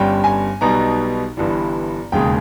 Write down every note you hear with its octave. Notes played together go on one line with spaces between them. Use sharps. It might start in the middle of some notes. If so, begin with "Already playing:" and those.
Already playing: G1 G2 G3 C#4 G5
G#5
B1 B2 G3 B3 D#4 A#5
G1 G2 E3 G3
E1 D#2 C#3 G#3 G5